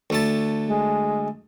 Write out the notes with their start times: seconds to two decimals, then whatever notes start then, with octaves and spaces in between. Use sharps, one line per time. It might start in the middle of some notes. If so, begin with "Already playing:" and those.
0.10 D2 A3 A5
0.67 G#3